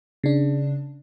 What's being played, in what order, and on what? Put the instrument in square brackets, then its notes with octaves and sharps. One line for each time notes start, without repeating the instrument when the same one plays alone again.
[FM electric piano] C#3 D4